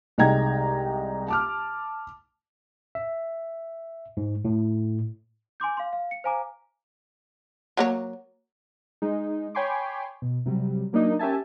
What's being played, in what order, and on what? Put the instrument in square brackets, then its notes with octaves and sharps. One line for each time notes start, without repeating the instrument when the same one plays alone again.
[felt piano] C2 G#3 D#4 G5 A#5 G#6
A5 D6 F6
[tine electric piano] E5
G#2
A2
[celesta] G#5 C6 D6 G6
F5 C6
F5
C#7
C5 F5 G#5 A#5 D6
[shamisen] F#3 A#3 C#5
[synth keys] G#3 D#4
C#5 G5 G#5 B5 C6 D6
B2
C3 F#3 G3
F#3 A#3 D4 D#4
C#4 G4 A#4 E5 G#5 A5